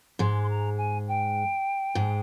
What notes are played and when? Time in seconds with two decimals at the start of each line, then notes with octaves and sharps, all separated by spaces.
0.19 G#2 G#3 C6
0.43 C6
0.49 A#5
0.77 G#5
1.08 G5
1.95 G#2 G#3